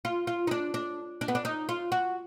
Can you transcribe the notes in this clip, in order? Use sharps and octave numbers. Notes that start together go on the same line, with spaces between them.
F4
F4
D#4
D4
D4
D4
B3
D4
D#4
F4
F#4